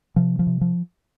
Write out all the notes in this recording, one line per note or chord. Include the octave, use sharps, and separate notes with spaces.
C3 F3
F3
C3
F3